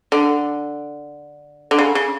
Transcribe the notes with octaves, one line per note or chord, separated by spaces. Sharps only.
D3
D3
C#3
C#3